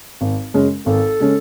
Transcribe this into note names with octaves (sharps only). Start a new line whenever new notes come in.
G#1
F#2 C#3 G#3 C#4
G#1 A4
C#3 G#3 C#4